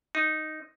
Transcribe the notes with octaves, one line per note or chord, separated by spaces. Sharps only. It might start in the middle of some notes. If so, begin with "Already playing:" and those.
D#4